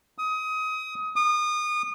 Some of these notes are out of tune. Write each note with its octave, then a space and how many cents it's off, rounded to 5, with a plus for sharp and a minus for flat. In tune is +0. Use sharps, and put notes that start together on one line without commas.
D#6 +25
D#6 -30